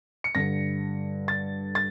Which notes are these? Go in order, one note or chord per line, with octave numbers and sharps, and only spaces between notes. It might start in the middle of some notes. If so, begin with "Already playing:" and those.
C#7
G2 D3 A#6
A6
A6